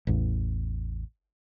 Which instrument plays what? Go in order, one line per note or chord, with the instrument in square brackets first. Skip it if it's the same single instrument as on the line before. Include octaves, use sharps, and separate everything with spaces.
[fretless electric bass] A1 E2